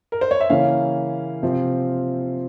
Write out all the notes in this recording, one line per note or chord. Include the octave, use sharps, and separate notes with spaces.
A#4
C5
C#5
E5
C#3 E3 A#3 C#4 F5
C3 F3 C4